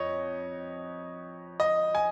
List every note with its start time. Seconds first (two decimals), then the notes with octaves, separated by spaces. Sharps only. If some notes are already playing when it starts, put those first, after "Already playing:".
Already playing: F2 C#5 D#5
1.60 D#5
1.95 G#5